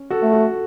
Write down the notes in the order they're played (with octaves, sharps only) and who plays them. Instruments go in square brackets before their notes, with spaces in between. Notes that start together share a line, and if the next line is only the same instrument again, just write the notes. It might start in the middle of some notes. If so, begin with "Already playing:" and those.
Already playing: [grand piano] C#4
F#4 A4
[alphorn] A3
[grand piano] F#4 A4